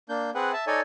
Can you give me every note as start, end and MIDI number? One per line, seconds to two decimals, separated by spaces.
0.09 0.30 58
0.09 0.30 62
0.09 0.30 91
0.35 0.52 60
0.35 0.52 68
0.35 0.52 71
0.35 0.52 78
0.53 0.65 76
0.53 0.65 81
0.67 0.81 63
0.67 0.81 69
0.67 0.81 73
0.67 0.81 74
0.67 0.81 80